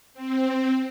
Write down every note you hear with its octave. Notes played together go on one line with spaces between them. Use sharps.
C4